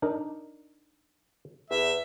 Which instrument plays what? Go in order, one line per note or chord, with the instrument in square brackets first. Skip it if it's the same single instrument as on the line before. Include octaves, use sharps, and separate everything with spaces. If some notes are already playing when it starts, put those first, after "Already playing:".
[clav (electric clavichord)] D4 D#4 A#4
[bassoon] E2 [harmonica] E5